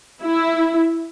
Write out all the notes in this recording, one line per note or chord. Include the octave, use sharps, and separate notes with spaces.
E4